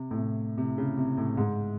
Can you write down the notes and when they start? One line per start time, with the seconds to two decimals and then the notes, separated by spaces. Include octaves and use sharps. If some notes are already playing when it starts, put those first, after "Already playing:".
Already playing: C3
0.11 A2
0.18 C3
0.58 C3
0.78 C#3
0.97 C3
1.18 A2
1.37 G#2